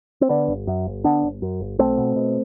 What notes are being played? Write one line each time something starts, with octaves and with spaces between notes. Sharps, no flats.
C4
D3 B3 D4
G1
F#2
G1
D3 B3 D4
G1
F#2
G1
B1 A3 C4
B2
B2